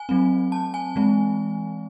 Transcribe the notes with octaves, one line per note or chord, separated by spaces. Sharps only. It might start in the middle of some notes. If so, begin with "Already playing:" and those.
Already playing: G#5
F#3 A3 C4
A5
G#5
E3 G#3 C4